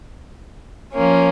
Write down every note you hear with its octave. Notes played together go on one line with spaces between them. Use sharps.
F3 A#3 C#4